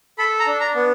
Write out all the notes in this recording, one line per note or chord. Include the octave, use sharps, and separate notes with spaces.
A4 B5
A#5
D4
A#5
B3